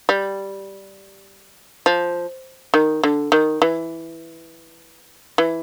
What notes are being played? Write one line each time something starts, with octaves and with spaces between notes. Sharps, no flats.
G3
F3
D#3
D3
D#3
E3
E3